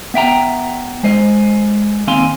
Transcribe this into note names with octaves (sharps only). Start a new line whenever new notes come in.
B3 E5 G5 A#5
G#3 C5 D#5
D#2 C4 F5 G#5 C6